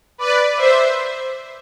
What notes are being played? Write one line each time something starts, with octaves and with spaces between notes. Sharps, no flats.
B4 D5
C5 E5